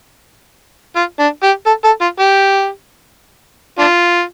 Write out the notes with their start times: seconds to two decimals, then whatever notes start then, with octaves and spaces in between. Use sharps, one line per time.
0.96 F4
1.19 D4
1.43 G4
1.66 A4
1.84 A4
2.01 F4
2.20 G4
3.79 D4 F4